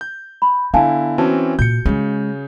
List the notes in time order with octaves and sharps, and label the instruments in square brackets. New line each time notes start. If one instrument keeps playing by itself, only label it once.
[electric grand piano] G6
[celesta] B5
[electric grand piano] D3 E4 [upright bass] B3 [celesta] F5 G#5 A5
[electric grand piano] E3 C4 C#4 [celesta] F#4 A5
[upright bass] A#2 [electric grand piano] G6 C#7
[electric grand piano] C#3 [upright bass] G#3 C#4